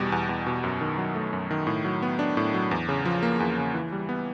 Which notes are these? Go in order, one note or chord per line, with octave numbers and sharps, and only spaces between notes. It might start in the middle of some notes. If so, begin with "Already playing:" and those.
Already playing: E2 B2 G3
E2
E2
B2
F#2
D#3
F#3
A3
F#2
D#3
A2
F#3
B3
D4
A2
F#3
E2
C#3
F3
A#3
E2
C#3
E3
G3
B3